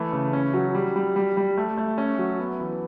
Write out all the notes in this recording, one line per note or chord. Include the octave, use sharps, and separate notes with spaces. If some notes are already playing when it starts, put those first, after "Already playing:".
Already playing: E3 A3
C#3
C#4
F#3
G3
G3
G3
G3
A3
A3
C#4
F#3
B3
E3